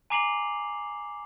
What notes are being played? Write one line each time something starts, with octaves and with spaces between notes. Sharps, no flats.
G#5 A#5 D6 C7 F7 F#7